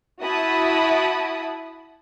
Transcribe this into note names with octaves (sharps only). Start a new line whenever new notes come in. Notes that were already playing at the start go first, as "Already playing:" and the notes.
E4 F#4 E5 A5 B5 D#6